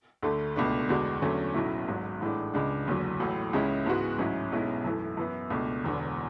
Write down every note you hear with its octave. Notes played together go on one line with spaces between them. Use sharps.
D2 D3 A3
C#2 B2 A3 D4
E2 D3 G#3 D4 F#4
E2 D3 F#3 A3 C#4
B1 A2 F#3 C#4 E4
G#1 G#2 F#3
A1 A2 E3 G#3 D4
C#2 C#3 G#3 D4
F#1 E2 D3 F#3
A1 A2 F#3
C#2 C#3 G#3 C#4 E4
G#2 E3 G#3 B3 F#4
A1 G#2 F#3 C#4 E4
B1 B2 G#3 C#4 E4
F#2 E3 A3 E4
F#2 E3 B3 E4
C#2 B2 A3 D4
E1 E2 D3